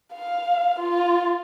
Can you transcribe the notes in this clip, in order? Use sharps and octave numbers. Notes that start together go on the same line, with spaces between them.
F5
F4